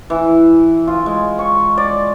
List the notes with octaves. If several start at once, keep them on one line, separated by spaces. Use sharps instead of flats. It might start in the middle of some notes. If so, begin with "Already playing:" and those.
E3
F4
G#3
C#6
D5